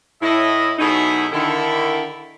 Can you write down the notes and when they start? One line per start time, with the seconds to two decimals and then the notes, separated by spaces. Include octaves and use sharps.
0.22 A2 E4 D#5
0.79 B2 F#3 A3 D#4 E4 G#4
1.32 D3 D#3 E4